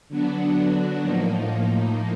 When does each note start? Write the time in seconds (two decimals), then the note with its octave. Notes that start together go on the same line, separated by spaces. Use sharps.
0.08 D3 F#3 B3 D4 F#4
1.01 A2 F3 A#3 D#4